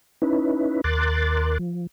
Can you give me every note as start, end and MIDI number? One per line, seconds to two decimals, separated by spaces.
0.22 0.81 61
0.22 0.81 63
0.22 0.81 64
0.22 0.81 71
0.84 1.58 39
0.84 1.58 70
0.84 1.58 84
0.84 1.58 86
0.84 1.58 90
0.84 1.58 93
1.59 1.87 53